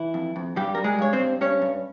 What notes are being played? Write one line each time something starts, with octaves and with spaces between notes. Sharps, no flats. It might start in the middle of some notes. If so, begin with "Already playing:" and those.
Already playing: E3 E4
F2
F2
G2 G3 G4
G3 A#4
G#3 G#4
G2 C#5
C4 C5
G2
G2 C#4 C#5
G2